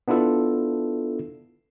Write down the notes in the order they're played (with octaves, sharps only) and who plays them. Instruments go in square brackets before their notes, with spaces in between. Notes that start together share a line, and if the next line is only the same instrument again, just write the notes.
[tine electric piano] B3 D4 E4 F4 A4